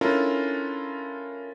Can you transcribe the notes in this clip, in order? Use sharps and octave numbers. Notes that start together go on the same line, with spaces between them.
C#4 D4 E4 F4 A4 A#4